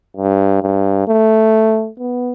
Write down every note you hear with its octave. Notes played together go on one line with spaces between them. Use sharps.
G2
G2
A3
B3